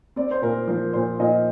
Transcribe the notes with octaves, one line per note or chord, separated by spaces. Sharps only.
C4 D5
C5
A#2 A#4
F3 A#4
A#2 C5
A#2 D#5